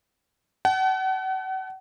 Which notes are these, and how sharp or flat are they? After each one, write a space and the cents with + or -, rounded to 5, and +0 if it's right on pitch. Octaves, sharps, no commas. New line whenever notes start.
F#5 +40 A5 -45